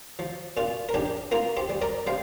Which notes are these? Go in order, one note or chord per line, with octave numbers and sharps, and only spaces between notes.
F3
A#2 F4
A#4
A#1 D4 G4
A#3 F4 A#4
G4 C5
G3
A#4 D5
G3 C5 F5